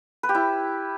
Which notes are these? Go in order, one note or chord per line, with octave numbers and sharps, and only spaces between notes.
B4
G4
E4